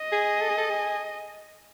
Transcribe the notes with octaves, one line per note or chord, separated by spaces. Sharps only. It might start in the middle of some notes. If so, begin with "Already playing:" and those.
Already playing: D#5
G#4
A4
G#4
A4
G#4